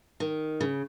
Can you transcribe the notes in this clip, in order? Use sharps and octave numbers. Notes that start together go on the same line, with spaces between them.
D#3
C#3